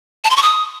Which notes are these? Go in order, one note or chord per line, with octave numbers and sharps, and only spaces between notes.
A5
C6
C#6
D#6